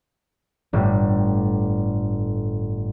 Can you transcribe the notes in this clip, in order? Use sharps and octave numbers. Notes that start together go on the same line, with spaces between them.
G1 A2 G3